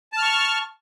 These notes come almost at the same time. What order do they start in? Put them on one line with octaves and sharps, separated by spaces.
A5 F6 C#6